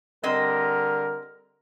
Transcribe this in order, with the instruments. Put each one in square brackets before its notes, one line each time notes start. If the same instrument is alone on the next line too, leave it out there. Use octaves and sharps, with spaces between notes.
[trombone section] D3 G3 A#4 [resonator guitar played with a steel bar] C4 D#5